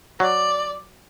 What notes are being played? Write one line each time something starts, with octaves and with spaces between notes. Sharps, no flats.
F#3 D5